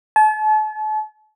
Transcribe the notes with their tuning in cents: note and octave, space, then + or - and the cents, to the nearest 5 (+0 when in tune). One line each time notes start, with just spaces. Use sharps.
A5 -40